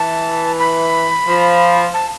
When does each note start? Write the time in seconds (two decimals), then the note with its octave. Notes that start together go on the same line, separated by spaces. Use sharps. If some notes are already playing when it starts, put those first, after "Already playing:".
Already playing: E3 A5
0.60 B5
1.27 F3
1.94 A5